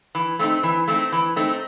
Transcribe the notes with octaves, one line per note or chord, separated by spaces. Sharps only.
E3
A3 C4 D#4
E3
A3 C4 D#4
E3
A3 C4 D#4